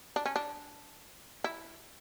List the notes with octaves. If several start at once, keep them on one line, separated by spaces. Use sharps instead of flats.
D4
C#4
D4
E4